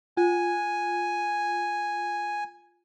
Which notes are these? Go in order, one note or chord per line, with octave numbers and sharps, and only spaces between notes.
F4 G#5